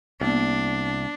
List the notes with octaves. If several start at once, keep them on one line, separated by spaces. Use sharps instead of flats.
C2 A#3 B3 D4